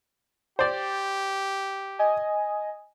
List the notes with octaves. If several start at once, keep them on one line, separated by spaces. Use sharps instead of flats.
G4 C5 D5
D#5 G#5